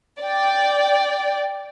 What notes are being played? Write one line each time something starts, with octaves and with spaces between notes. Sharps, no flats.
D5 G5